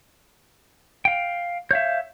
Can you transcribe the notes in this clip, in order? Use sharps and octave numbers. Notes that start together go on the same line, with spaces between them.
F5 G5
C#5 E5 F5 G6